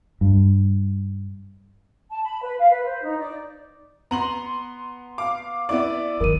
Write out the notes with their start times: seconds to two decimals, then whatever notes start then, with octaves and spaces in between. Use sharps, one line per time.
0.21 G2
2.10 A5
2.24 B5
2.42 B4
2.60 F5
2.72 B4
2.86 C5
3.02 D#4
3.20 D5
4.11 B3 A#5 C6 F#7
5.18 F5 D6
5.69 B3 E4 D5 D6
6.21 D#3 E3 A#4 D#7